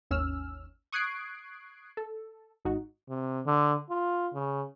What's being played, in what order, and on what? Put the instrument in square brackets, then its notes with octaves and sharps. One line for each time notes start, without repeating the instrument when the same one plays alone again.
[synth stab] G#1 D#2 C#4 E6 F6
C#6 D#6 F#6 G#6 C7 D7
A4
G#1 D#4 F#4
[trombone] C3
D3
F4
C#3